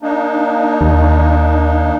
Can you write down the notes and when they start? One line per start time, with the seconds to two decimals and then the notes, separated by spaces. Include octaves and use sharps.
0.02 A#3 D4 D#4
0.81 D#2